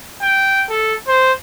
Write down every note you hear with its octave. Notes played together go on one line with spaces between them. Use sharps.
G5
A4
C5